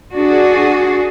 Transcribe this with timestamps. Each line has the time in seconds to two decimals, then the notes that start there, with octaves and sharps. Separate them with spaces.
0.14 D4 F#4 G#4